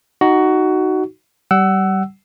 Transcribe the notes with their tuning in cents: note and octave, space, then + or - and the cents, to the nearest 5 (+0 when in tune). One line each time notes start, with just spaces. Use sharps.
D#4 +0 F#4 +15
G3 -20 F#5 +20 E6 +0